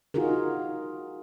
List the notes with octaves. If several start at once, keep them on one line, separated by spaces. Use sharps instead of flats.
D#4 F4 F#4 G#4 A#4